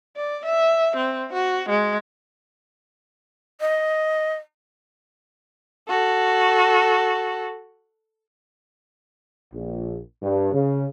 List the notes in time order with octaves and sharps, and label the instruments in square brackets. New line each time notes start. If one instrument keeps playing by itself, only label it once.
[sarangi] D5
E5
C4
F#4
G#3
[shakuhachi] D#5
[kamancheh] F#4 A4
[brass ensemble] A#1
G2
C#3